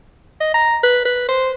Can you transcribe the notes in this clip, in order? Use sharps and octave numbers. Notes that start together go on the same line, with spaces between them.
D#5
A#5
B4
B4
C5